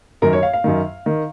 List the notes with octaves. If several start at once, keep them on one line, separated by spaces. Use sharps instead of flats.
F#2 D#3 A#4
C#5
F5
F5
F#2 D#3
D#3